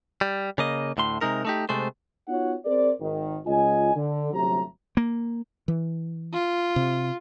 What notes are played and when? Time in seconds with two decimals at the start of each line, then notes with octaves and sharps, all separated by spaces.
0.21 G3
0.58 C#3 A#3 D#5
0.97 D2 A2 C6
1.21 C3 G#3 D#4 A#4
1.45 A3 D#4 G4
1.69 C3 G#3 A3 C5
2.28 B3 D#4 F4 F#4 C#5 F#5
2.65 C4 G#4 A#4 C5 D5
3.00 G#1 D#3
3.46 C#2 F4 D#5 G#5
3.95 D3
4.33 G1 C3 F#3 A3 A#5
4.97 A#3
5.68 E3
6.33 F4
6.76 C3